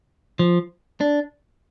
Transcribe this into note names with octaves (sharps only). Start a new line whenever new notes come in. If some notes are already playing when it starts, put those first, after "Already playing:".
F3
D4